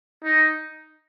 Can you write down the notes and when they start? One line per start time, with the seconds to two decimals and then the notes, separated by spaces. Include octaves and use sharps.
0.24 D#4